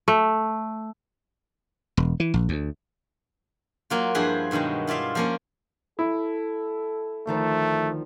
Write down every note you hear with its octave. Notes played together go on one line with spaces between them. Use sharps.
A3
E1
E3
A#1
D2
F#3 A#3 F4
G2 F3 E4 G#4 B4 C5
G2 B2 D#3 F#3 G#3
E4 F4 D5 E5 F5
F3 A#3 C#4
E4 A4
D2 D#3 F3 A3